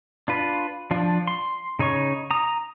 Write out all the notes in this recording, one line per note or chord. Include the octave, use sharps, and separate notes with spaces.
D4 F4 B4
F3 D4 F4
C6
C#3 D#4 C#5 C#6
A#5 D#6